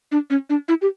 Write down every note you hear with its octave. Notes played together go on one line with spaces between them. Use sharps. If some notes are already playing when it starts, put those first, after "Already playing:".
D4
C#4
D4
E4
G4